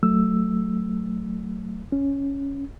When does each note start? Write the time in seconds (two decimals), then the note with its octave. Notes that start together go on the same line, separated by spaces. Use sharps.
0.03 F#3 A3 E6
1.92 C#4